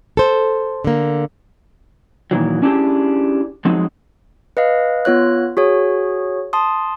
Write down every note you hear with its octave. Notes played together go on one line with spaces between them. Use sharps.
A4 C5
D3 A#3
A#2 D#3 E3 F#3
C#4 D4 E4 G4 G#4
F3 F#3 G#3 C4 D#4
B4 D#5 F5
B3 F4 C#5 F#6
F#4 G#4 C#5
A5 C6 D#6